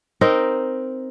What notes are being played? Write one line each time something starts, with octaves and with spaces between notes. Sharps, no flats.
C4 D#4 A#4